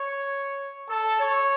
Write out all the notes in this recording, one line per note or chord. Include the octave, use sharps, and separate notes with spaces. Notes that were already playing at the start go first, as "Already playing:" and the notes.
Already playing: C#5
A4
C#5